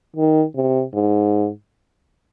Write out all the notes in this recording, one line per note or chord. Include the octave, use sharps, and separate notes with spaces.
D#3
C3
G#2